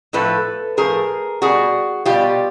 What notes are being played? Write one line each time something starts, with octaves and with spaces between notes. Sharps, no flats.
A2 F3 A3 A4 B4
A2 F3 A3 G#4 A#4
B2 G3 F#4 G#4
B2 G3 F4 G4